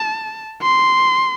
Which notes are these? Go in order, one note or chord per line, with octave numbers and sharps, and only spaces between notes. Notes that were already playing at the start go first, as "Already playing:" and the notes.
Already playing: A5
C6